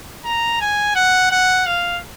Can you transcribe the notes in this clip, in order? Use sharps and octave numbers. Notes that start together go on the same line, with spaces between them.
A#5
G#5
F#5
F#5
F5